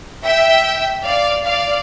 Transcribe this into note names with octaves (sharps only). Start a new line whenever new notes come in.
E5 G5
D5 F5
D5 F5